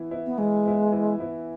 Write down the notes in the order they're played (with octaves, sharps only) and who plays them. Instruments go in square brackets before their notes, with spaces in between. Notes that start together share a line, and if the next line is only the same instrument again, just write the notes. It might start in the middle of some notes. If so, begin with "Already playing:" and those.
Already playing: [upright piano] E3 B3 E4
B3 E4
[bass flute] B3
[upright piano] E3 [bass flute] G#3
[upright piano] B3 E4
E3
B3 E4